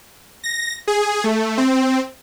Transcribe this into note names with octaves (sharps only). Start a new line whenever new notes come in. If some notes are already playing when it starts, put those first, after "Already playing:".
A#6
G#4
A3
C4